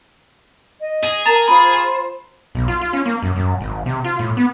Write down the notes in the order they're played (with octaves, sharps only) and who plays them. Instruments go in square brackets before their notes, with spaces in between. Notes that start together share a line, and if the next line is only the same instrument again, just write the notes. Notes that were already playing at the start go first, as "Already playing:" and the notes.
[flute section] D#5
[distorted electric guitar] G#4
[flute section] A#4 [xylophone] A5 A#5 A6
[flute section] F4 C5 [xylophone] B5
[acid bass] B1
F4
F4
C#4
A#3
F#2
F#2
G#1
C3
F4
A2
B3